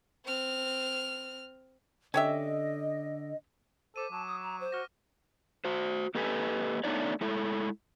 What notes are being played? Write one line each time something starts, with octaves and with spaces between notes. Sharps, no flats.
C4 F6
D3 C#4 G4 D#5 E5
A4 C5 D6 D#7
F#3 A5
D#6
A#5
C5
F#4 F6 A#6
F#4 C5
A#3 G4 A4 B4 D#5 G#5
A3 B3 D4 D#4 C#5 D5
G#3 A3 E4 A4